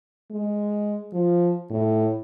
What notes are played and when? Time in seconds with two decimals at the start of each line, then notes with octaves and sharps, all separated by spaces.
0.31 G#3
1.13 F3
1.70 A2